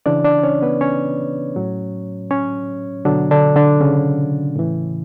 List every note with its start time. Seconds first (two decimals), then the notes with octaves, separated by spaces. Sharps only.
0.06 C#3 E3 D4 D5
0.25 D4 D5
0.43 C#4 C#5
0.62 B3 B4
0.81 C#4 C#5
1.56 A2 F#3
2.31 C#4 C#5
3.05 B2 D3 F#3 D4
3.31 D3 D4
3.55 D3 D4
3.81 C#3 C#4
4.56 A2 E3